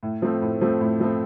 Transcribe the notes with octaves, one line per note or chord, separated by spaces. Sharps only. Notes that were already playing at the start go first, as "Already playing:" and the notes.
A2
F3 A3 C4
A2
F3 A3 C4
A2
F3 A3 C4